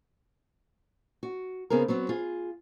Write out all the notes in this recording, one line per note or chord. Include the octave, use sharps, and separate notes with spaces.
F#4
C#3 B3 C4 G#4 A#4
F#3 B3 C4
F4 G#4